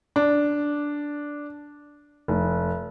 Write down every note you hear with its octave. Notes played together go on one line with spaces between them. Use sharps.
D4
F1